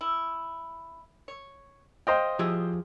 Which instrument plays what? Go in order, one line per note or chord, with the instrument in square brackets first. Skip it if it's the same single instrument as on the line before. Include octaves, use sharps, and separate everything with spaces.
[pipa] E4
C#5
[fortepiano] C5 D#5 G5 [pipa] F5
[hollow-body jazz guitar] F3 G4 G#4 [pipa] E4